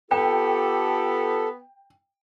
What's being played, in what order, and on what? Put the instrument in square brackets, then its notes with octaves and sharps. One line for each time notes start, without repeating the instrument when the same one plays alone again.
[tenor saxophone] B3 [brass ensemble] F4 G4 [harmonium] A4 [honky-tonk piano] G5